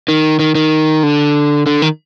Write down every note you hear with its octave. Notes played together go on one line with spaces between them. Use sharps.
D#3
D#3
D#3
D3
D3
D#3